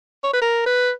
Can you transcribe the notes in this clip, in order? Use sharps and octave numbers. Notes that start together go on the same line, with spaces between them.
C#5
B4
A#4
B4